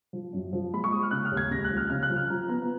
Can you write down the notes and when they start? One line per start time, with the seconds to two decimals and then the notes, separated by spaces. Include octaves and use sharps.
0.13 F3
0.33 F#2
0.53 F3
0.73 G#3 B5
0.84 C#6
0.92 G#3 D#6
1.03 F6
1.11 C#3 F#6
1.25 F6
1.32 D#2
1.37 G#6
1.51 C#2 A#6
1.64 F#6
1.71 F3
1.77 F6
1.90 C#3 F6
2.03 F#6
2.09 F3
2.16 F6
2.30 F3 A#5
2.49 B3 A#5